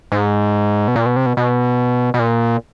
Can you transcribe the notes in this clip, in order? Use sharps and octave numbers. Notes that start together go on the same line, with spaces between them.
G#2
B2
A#2
B2
C3
B2
B2
B2
A#2